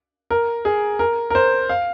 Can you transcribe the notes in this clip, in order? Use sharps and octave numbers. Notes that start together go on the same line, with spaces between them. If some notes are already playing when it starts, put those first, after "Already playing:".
A#4
G#4
A#4
A#4
C5
F5